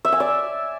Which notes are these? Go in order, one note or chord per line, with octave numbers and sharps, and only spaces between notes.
E5
G#5
D5